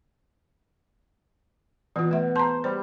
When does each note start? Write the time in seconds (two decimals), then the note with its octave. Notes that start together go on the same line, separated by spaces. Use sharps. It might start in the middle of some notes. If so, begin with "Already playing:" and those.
1.96 B2 E3 F4
2.11 A3 E5
2.36 C5 A5 A#5
2.64 G3 C5